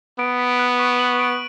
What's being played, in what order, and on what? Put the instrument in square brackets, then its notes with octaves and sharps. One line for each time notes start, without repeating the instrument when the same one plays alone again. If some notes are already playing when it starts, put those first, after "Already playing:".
[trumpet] B3 [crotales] D7
[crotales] B6
F#6
C#6
F#7
D7